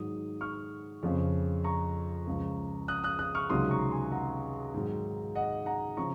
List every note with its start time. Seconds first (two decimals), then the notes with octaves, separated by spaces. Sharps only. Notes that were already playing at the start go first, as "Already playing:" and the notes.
Already playing: G#2 D#3 F#3 D#6
0.41 C#6 F6
1.03 F2 C#3 F3
1.64 A#5 C#6
2.27 C#2 C#3 F3
2.88 D#6 F#6
3.04 D#6 F#6
3.19 D#6 F#6
3.35 C#6 F6
3.50 C#2 C3 D#3 F#3 C6 D#6
3.71 A#5 C#6
3.91 G#5 C6
4.12 F#5 A#5
4.74 G#2 D#3 F#3
5.35 D#5 F#5
5.66 F#5 A#5
5.97 C#3 F3 A#5 C#6